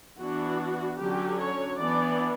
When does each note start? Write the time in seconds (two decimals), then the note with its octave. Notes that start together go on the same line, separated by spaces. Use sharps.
0.20 E3 B3 D4 F#4
0.99 D3 F#3 C#4 G4
1.40 C#5
1.80 E3 B3 D4 D5